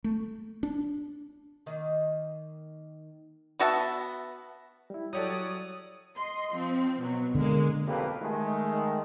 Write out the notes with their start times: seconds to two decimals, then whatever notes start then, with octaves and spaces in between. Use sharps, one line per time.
0.04 A3
0.63 D4
1.66 D#3 A#3 D#5
3.60 B3 F#4 E5 A5
4.90 G3 E4
5.13 F#3 F#4 G4 A4 C#5 D5 D#6
6.16 D#5 C6
6.54 F3 C4
6.99 B2 F#3
7.35 D3 G#3 A#3
7.87 B1 F2 A#3 G4 A4 B4
8.22 D#3 G#3 A3